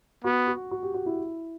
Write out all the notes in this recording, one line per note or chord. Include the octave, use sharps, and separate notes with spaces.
B3 F#4
F#4
F#4
G4
F#4
E4